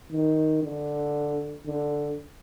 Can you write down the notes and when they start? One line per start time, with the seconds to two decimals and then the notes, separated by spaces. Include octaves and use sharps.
0.11 D#3
0.63 D3
1.66 D3